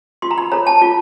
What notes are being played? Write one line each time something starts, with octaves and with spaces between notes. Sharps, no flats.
F4 C6
A#5
B5
A4 C#5 A#5
A5
F4